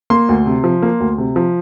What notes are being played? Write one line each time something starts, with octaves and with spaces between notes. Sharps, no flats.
A#3 C6
D2
C3
F3
A#3
D2
C3
F3